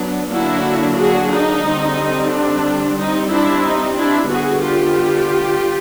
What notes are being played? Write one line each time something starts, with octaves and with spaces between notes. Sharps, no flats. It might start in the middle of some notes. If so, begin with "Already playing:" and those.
Already playing: F#3 B3 D4
D3 F#3 A#3 D4 E4 F#4
F#4 G#4
D#4
D3 G3 C4
D4
G3 C4 D#4
D4 E4
D#4
D4 E4
D3 G3 B3 F#4 G#4
F4 G4